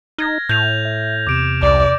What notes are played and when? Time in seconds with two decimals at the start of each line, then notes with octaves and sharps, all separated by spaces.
0.18 D#4 F6 G#6 A#6
0.49 A2 G6 F7
0.85 E5
1.27 E2 C3 D6 D7 E7
1.62 C2 D5